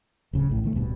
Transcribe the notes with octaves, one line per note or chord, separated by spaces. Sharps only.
D1 C#3
A1 A2
B1 D#3 A3
D1 G2 B2